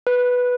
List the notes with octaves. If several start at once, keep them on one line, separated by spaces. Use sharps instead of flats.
B4